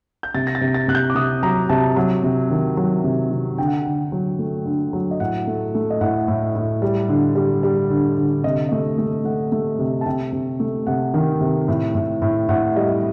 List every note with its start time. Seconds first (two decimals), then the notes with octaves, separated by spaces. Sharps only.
0.23 G6
0.34 C3 A6
0.47 A#6
0.55 A6
0.61 C3
0.74 A6
0.88 C3 F#6
0.95 G6
1.10 D6
1.15 C3 D#6
1.43 F#3 A#5
1.69 C3 A5
1.96 F#3
2.24 C3
2.51 D#3
2.77 F#3
3.04 C3
3.31 C3
3.58 D3 G5
3.67 F#5
3.77 G5
3.85 D3
4.12 F#3
4.39 A3
4.66 D3
4.93 F#3
5.11 D#5
5.20 A2 F#5
5.47 A3
5.75 A3
5.90 D#5
6.01 A2 F#5
6.28 A2
6.56 A2
6.82 G3
7.09 D3
7.35 G3
7.63 G3
7.90 D3
8.17 D3
8.43 C3 D#5
8.69 A3 D#5
8.98 A3
9.24 A3 F#5
9.52 A3
9.79 C3
10.01 A5
10.06 C3 G5
10.32 C3
10.60 A3
10.87 C3 F#5
11.14 D#3
11.41 C3
11.68 A2
11.95 A2
12.22 A2
12.49 A2 F#5
12.76 G3 D#5